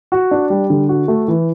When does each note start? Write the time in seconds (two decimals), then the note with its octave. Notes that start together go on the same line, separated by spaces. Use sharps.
0.12 F#4
0.31 D4
0.50 G3
0.70 D3
0.89 F#4
1.08 A3
1.28 E3